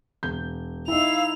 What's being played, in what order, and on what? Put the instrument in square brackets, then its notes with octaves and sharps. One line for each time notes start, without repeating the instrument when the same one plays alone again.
[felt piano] E1 G6
[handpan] D#4 E4 [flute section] F5 E6 [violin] F7